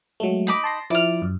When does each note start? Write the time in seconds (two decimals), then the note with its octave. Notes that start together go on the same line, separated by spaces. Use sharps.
0.20 F#3 G#3 A3
0.47 D#4 B5 D6
0.64 A5 C6 A#6
0.90 F3 E4 D5 F6
1.22 F#2